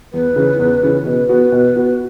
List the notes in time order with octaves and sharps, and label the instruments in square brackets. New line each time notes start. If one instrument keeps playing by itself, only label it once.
[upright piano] E2 [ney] B4
[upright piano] C#3 E3 C#4
E2
C#3 E3 C#4
[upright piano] B2 [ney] B4
[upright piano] B3 F#4
B2
B3 F#4